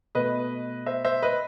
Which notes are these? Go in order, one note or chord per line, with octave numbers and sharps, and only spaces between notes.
B2 A3 B4 D#5
C5 E5
C5 E5
B4 D#5